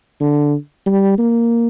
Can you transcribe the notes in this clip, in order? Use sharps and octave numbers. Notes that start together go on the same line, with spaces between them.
D3
G3
A#3